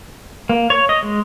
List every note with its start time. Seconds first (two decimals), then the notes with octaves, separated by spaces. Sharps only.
0.49 A#3
0.70 C#5
0.89 D#5
1.02 G#3